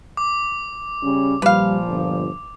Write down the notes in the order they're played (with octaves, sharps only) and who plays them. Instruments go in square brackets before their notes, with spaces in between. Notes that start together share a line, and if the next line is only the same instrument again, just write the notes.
[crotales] D6
[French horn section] C#3 G3 C#4
[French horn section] A#2 F3 [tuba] G3 [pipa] B4 F5
[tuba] G1